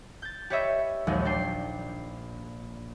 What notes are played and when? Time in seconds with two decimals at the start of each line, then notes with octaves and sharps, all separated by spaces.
0.22 G6 A6
0.50 G4 B4 C#5 D#5 E5
1.07 A#1 D#2 F#3 G#3
1.25 D4 G5 C7